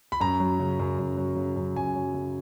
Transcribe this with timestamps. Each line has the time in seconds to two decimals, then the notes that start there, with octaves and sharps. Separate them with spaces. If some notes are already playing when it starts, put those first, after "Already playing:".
0.12 B5
0.20 F#2 A#5
0.40 F#3
0.60 C#3
0.79 F#2
0.99 F#2
1.17 F#3
1.36 C#3
1.56 F#2
1.76 F#2 G#5
1.96 F#3
2.14 C#3